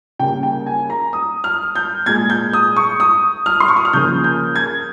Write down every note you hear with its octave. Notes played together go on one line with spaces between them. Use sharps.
C#3 G3 A#3 G5
G5
G#5
A#5
D#6
F6
G6
A#2 G#3 G#6
G6
D#6
C#6
D#6
F6
C6
C#6
D#6
F6
C#3 F3 A#3 G6
G6
G#6